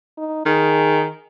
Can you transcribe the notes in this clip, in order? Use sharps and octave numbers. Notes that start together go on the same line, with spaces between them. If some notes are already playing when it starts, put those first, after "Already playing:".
D#4
D#3 G#4